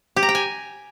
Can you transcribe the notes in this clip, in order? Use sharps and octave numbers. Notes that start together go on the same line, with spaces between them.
G4
A#5
G5
G#5